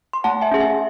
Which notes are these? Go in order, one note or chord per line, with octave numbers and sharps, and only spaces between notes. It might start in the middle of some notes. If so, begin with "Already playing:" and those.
C6
A3 F#5 A5
E5 G#5
C#4 G#4
E5 G#5